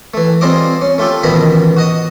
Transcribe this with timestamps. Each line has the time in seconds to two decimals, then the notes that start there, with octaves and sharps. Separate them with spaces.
0.14 E3 A3
0.41 G3 C4 F4 G#4 D#5 D6
0.82 C#4
0.98 A3 F4 G4 A4
1.23 A1 B2 D#3 F3 D#5 B5
1.77 F#4 D#5 D#6